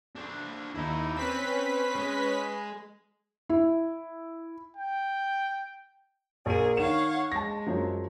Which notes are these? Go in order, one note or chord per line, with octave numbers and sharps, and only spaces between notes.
D4 C5
D#2 D#4 E4
C4 C#4 B4 B6
G#3
E4
G5
A#1 G#4 A#4 D#7
D#3 C#5 F5 F#5 E7
G#3 A5 A#6
F#2 F3 F#3